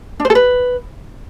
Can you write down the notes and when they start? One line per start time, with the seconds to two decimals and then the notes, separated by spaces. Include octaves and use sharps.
0.20 D4
0.25 C5
0.30 A4
0.35 B4